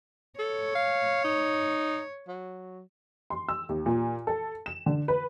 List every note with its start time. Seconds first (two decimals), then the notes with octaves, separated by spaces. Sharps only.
0.39 A4 C#5
0.75 F5
1.24 D#4
2.28 F#3
3.30 C6
3.49 E6
3.69 D#2
3.86 A#2
4.27 A4
4.66 E7
4.86 D3
5.08 B4